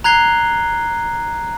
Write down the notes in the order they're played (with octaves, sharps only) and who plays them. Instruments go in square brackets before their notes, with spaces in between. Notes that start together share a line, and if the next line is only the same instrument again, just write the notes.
[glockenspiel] A#5 F#6 G#6 C7 G7